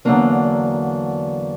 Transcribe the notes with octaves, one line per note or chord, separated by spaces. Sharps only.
E2 D3 F#3 A#3 D4